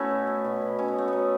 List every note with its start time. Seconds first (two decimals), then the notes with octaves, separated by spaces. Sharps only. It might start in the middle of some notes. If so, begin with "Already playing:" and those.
Already playing: A3 B3 C#4 E4 F#4
0.10 B2
0.27 A3
0.45 B2
0.61 B2
0.78 B2 C#4
0.88 B3
0.95 B2 A3
1.08 F#3 B3